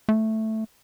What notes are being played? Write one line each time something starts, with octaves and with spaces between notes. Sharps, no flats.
A3